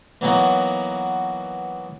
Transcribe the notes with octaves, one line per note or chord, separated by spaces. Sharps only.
E3 F#3 A#3 B3 D#4 F#4